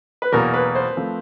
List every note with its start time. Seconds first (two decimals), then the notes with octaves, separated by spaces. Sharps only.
0.22 B4
0.32 E2 B2 F#3 A#3 A#4
0.54 B4
0.75 C5
0.97 F3 A3 C4